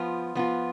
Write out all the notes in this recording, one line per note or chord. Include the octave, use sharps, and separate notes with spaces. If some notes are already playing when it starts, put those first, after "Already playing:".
Already playing: F3 B3 F4
F3 B3 F4